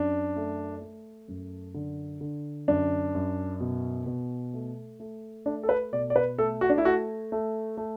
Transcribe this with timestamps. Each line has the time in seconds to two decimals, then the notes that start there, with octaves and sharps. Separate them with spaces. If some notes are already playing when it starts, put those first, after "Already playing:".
Already playing: F#2 D4
0.36 A3
0.82 A3
1.28 F#2
1.74 D3
2.21 D3
2.68 F#2 D4
3.15 F#2
3.60 B2
4.06 B2
4.54 A3
5.00 A3
5.46 A3 D4
5.63 A4
5.69 B4
5.92 B2 D5
6.10 D5
6.16 B4
6.38 A3 A4
6.61 F#4
6.70 D4
6.78 E4
6.84 A3 F#4
7.32 A3
7.77 A3